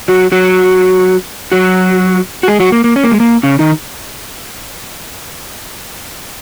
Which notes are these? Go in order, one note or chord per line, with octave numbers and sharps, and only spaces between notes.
F#3 F#4
F#3 F#4
F#3 F#4
F#4
G#3 G#4
F#3 F#4
A#3
A#3
C#4
A#3
G#3
A#3
C#3 C#4
D#3 D#4